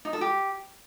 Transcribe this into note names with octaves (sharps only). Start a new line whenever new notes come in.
D#4
A4
G4